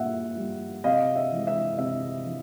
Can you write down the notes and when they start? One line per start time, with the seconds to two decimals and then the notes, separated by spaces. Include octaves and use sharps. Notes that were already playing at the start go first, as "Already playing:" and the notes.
Already playing: A#2 G3 E5 F#5
0.37 G3
0.84 C3 D#5 F5
1.16 E5
1.32 E3 G#3
1.47 E5
1.78 C3 E5
2.25 E3